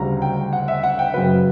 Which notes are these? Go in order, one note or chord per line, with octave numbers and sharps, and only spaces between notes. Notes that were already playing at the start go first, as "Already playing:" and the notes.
Already playing: D2 C#3 G3 A#5
G5
F#5
E5
F#5
G5
F#2 C#3 F#3 B4